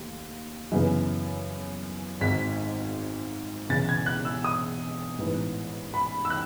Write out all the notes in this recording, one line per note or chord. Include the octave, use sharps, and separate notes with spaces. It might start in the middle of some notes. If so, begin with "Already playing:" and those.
Already playing: D#2 A3
F#2 C#3 E3 B3
G#1 G#2 D#3 B6
E1 E2 C#3 E3 A6
G#6
F#6
E6
D#6
A1 G#2 E3 B3
B5
E6
F#6